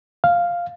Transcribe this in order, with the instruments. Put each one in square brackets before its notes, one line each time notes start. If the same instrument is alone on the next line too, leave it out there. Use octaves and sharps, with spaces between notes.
[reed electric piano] F5